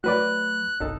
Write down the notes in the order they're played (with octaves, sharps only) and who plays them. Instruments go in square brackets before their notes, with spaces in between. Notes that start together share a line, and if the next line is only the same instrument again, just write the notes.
[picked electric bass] F#3 A3 [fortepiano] F#4 B4 D5 [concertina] F#6
[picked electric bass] F#1 B1 [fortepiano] D#4 A4